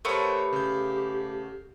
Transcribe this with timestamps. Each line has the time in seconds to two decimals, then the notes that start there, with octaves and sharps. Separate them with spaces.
0.05 A3 B3 G4 A#4 C5 C#5
0.53 C#3 G6